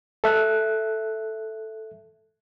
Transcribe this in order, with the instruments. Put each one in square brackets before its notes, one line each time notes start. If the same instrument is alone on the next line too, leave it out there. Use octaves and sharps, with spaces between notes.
[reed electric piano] A4 E5 F#6